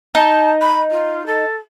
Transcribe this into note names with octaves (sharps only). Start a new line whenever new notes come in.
D#4 A5
B5
F4
A4